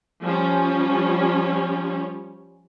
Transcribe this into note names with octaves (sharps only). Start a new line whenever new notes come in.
F3 G3 C#4